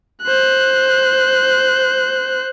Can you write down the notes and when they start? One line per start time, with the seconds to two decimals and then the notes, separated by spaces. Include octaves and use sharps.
0.22 C5 F#6